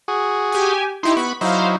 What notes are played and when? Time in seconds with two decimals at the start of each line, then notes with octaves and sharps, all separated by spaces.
0.08 F#4 G#4
0.52 G4 G#5
1.03 D#4 E4 G4 C6
1.17 B3 B5 C#6
1.41 F#3 D#4 E4 C5 F5